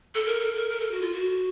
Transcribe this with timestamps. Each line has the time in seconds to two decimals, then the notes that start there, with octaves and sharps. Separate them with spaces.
0.15 A4
0.26 A#4
0.41 A4
0.55 A#4
0.70 A#4
0.80 A4
0.91 F#4
1.02 F4
1.13 F#4